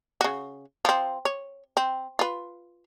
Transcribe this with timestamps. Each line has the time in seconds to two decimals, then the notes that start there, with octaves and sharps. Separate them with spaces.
0.21 C#3 F#4
0.85 F3 C4
1.25 C#5
1.77 C4
2.19 F4 B4